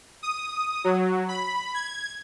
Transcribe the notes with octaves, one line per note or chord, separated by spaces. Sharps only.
D#6
F#3
B5
G#6